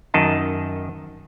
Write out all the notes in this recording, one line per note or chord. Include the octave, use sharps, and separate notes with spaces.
F#2 D#3 D#5 A5